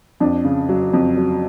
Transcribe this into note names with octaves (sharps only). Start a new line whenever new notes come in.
F2 D4
C#3
F#3
F2
F#3